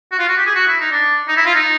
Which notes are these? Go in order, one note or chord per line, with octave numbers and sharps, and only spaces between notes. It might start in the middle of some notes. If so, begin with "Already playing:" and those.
F#4
F4
F#4
G4
G#4
F#4
E4
D#4
D4
D#4
E4
F4
D#4